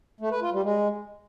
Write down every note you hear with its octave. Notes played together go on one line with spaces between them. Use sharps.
A3
B4
F4
G3
G#3